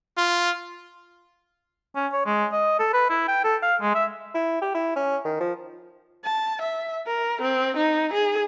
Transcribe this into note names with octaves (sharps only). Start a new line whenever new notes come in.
F4
C#4
C#5
G#3
D#5
A4
B4
E4
G5
A4
F5
G#3
E5
E4
G4
E4
C#4
D#3
F3
A5
E5
A#4
C4
D#4
G#4